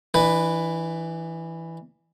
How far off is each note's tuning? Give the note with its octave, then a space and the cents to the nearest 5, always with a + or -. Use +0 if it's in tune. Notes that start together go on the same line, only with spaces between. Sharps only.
E3 +0 D4 +35 B4 +0